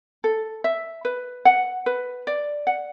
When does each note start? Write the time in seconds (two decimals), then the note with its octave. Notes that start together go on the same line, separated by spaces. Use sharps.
0.24 A4
0.64 E5
1.05 B4
1.45 F#5
1.86 B4
2.27 D5
2.67 F#5